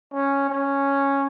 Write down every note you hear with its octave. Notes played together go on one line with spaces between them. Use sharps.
C#4
C#4